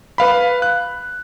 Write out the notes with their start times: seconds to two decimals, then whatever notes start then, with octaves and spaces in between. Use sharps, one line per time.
0.18 B4 F5 B5
0.62 F#6